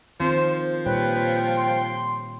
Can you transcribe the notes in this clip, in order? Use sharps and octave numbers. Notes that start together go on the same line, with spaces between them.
D#3 F3 C4 C5
A#2 G3 B4 C#5 G5
C6